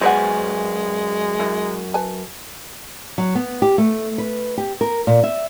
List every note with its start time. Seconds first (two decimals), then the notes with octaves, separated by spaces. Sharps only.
0.01 F#2 G#3 B4 C5 D5 F#5 G#5
1.39 F#2 E4
1.94 B4 G#5 A5
3.18 F#3
3.35 B3
3.62 G4
3.78 A3
4.18 B4
4.58 G4
4.81 A#4
5.07 A#2
5.23 E5